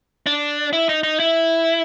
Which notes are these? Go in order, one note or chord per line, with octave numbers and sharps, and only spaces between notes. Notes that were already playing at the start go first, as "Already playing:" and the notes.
D4
E4
D#4
D#4
E4